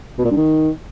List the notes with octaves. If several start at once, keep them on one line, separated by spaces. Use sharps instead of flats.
B2
A#2
G2
D#3